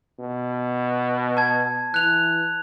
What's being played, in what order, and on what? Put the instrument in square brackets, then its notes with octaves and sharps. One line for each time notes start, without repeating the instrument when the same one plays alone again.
[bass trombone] B2
[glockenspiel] A5 G#6
[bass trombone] E3 [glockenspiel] F#6 F7